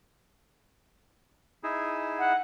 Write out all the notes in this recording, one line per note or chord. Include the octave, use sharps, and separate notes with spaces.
D#4 E4 G#4
F#5